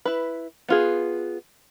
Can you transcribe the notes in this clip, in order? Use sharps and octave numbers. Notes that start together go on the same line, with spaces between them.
E4 B4
B3 F4 G#4